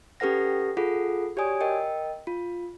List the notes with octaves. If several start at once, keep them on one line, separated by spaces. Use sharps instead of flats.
C#4 G4 A4 B4 F#5 A#6
F4 G#4 A4 F#5
F#4 G4 C#5 D5 G#5 D#6
A#4 D#5 G5
F4